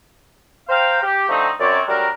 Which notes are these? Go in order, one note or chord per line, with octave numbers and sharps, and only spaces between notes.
C5 F5 G5 A#5
G4
D3 F3 A3 C4 D#4
F#2 C3 C#5 D5
F#3 G3 A3 D4 A#4